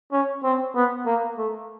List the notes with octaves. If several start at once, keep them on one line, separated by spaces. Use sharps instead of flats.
C#4
C4
B3
A#3
A3